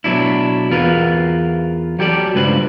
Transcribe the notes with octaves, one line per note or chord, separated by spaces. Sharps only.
B2 F#3 D4 E4
E2 F4 A#4 B4
F#3 G4 A4 D5
C#2 G2 B4 C5